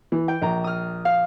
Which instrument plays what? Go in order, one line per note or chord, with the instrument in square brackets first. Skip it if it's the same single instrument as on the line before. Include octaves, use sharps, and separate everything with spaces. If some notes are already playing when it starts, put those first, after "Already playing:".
[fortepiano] E3
[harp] G5
[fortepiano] A#1 A#5
[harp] D#6 F6
F5